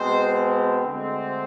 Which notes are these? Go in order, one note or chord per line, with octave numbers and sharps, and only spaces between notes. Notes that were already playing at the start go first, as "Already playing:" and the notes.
Already playing: B2 G#3 C4 C5
D2 D3 G#3 C4